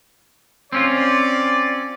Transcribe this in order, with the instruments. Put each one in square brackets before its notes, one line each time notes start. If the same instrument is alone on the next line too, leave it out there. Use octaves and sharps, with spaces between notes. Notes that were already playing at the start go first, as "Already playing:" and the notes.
[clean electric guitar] C4 C#4 F4 [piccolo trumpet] D5